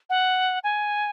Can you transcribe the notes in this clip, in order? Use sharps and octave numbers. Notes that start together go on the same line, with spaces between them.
F#5
G#5